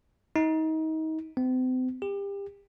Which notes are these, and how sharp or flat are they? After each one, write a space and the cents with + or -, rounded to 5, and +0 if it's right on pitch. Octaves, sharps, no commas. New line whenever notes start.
D#4 +30
C4 -40
G4 +30